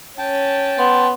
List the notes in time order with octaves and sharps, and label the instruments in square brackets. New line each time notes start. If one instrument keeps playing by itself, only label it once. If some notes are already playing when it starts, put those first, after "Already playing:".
[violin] C#4 [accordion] G5 A5
[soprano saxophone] B3 [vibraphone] C6